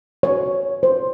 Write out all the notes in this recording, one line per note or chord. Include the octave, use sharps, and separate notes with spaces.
C#5
C5